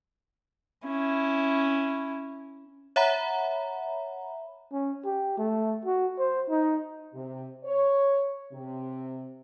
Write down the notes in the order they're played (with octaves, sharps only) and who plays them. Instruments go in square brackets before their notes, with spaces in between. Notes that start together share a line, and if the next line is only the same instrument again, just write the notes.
[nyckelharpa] C#4 E4
[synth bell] C#5 E5 F#5 A#5 B5
[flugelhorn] C#4
G4
A3
F#4
C5
D#4
[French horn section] C3
C#5
C3